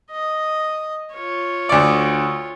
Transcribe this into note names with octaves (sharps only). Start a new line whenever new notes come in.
D#5
F4 C#5
D2 D5